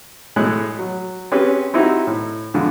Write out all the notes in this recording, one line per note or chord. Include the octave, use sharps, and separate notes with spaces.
A2 G#3 A3 F#6
F#3
C4 C#4 G4 G#4 B4 C5
C4 D#4 E4 F#4 G4
A2
F2 D3 G#3